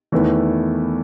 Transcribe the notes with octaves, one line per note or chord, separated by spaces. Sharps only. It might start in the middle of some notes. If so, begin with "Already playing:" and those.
E2 D#3 A3 E4 B4